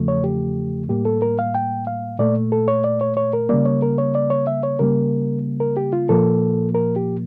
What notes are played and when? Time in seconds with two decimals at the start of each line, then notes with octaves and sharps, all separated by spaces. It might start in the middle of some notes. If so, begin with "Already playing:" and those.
Already playing: E2 C#3 F3 A3
0.08 C#5
0.24 G4
0.89 A2 G3 A#3 G4
1.05 A4
1.22 A#4
1.39 F5
1.55 G5
1.87 F5
2.19 A#2 A3 D5
2.52 A4
2.68 C#5
2.84 D5
3.01 C#5
3.17 C#5
3.33 A#4
3.49 C#3 G3 A#3 D5
3.66 C#5
3.82 A#4
3.98 C#5
4.15 D5
4.30 C#5
4.47 E5
4.63 C#5
4.79 C#3 G3 A#3 A#4
5.60 A#4
5.77 G4
5.93 F4
6.09 A#2 F3 A#3 A4
6.74 A#4
6.96 G4